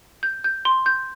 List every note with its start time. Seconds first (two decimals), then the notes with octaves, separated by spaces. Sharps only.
0.23 G6
0.44 G6
0.65 C6
0.86 G6